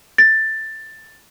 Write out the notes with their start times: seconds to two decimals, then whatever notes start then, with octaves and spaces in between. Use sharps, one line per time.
0.18 A6